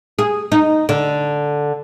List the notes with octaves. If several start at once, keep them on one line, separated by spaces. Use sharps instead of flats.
G#4
D#4
D3